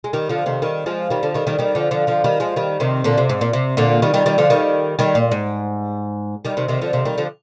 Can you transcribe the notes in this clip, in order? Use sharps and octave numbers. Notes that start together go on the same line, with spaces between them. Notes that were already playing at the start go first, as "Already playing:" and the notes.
G#3
D#3 G3
D3 F3
C3 D#3
D#3 G3
F3 G#3
D#3 G3
D3 F3
D#3 G3
D#3 G3
D#3 G3
D3 F3
D3 F3
D3 F3
D#3 G3
F3 G#3
D#3 G3
C3 D#3
A#2 D3
C3
G#2
A#2
C3
A#2 D3
D#3 G3
D#3 G3
D#3 G3
D3 F3
D#3 G3
D#3 G3
A#2
G#2
D#3 G3
C3 D#3
C3 D#3
D3 F3
C3 D#3
D#3 G3
D3 F3